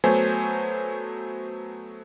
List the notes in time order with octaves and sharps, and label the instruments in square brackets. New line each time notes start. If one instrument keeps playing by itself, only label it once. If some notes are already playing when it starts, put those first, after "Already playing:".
[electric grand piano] F#3 A3 B3 C5 G#5